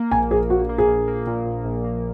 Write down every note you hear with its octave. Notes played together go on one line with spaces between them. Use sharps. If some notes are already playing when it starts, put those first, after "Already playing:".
Already playing: A#3
A#1 G#5
A#1 G#4
A#1 F#4
A#3
G#4
A#1
A#3
A#2
A#1
A#1
A#3